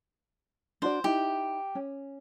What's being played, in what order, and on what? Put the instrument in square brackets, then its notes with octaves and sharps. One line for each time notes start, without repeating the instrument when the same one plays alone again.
[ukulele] D4 F#4 D5 [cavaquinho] C5
[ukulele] D#4 E4 [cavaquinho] G4
[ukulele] C#4